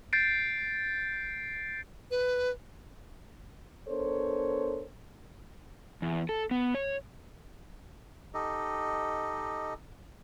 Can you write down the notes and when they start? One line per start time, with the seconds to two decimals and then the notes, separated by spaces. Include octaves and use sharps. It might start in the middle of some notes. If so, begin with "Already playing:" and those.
0.13 G6 A6 C7 D7
2.11 B4
3.88 B3 D4 A4 A#4 C5 C#5
6.02 E2
6.29 A4
6.51 B3
6.75 C#5
8.34 D#4 G4 A4 D#5